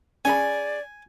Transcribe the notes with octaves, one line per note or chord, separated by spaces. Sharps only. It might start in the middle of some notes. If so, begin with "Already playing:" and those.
C#4 G#4 D5 G#5 B5